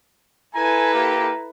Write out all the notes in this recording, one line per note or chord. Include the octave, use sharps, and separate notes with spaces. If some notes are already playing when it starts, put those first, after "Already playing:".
E4 A4 B4 G#5 A#5
A#3 G4